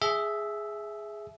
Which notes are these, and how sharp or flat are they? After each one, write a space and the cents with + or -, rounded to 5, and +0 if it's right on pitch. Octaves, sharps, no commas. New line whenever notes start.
G#4 +0 E5 +0 A5 -45